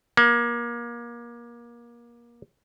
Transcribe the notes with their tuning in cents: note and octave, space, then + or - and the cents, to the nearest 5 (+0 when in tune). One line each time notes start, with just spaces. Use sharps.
A#3 +30